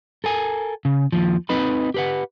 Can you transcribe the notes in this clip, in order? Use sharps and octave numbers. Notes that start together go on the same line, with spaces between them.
A4 A#4 G#5
C#3
D#2 F3
C4 D#4 B4 D#5 B5
G4 B4 F#5